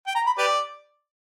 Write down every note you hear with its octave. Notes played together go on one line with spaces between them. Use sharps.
G5
A#5
B5
G4 B4 D5